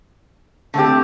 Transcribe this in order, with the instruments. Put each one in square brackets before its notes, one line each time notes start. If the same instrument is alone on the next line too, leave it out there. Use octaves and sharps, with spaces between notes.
[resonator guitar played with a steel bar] D3 A3 C4 G4